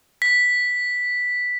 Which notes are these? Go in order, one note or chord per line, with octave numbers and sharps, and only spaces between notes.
B6